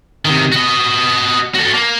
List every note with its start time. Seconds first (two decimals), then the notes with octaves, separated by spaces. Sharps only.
0.25 C3 D#3
0.52 F#4 D#5
1.55 F#4 A4
1.73 A#3